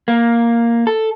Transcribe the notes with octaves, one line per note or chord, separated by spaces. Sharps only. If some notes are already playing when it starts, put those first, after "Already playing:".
A#3
A4